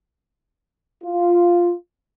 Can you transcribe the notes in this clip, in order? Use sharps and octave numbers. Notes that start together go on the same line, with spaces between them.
F4